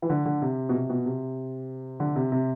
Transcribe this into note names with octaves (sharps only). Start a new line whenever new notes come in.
E3
D3
D3
C3
B2
C3
B2
C3
D3
C3
C3